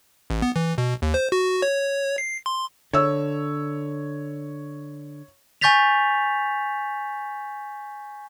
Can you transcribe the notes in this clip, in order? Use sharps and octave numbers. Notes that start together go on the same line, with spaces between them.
A1
B3
E3
B2
D#2
C5
F#4
C#5
C7
C6
D3 C#5 E6
G#5 C#6 G6 A6 B6 F7